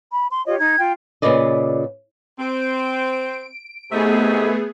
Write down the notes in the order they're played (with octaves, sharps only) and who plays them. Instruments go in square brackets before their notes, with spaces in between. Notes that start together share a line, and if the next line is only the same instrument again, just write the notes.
[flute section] B5
C6
F4 G4 C#5 D#5
D#4 G#6
F4 G5
[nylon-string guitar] A#2 C#3 F4 B4 D5 D#5
[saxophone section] C4 [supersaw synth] D7
[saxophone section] C3 D#4 E5 [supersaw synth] A3 B3 G#4